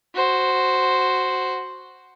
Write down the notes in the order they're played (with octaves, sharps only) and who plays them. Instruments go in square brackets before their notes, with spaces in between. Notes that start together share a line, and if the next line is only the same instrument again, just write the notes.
[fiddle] F#4 C5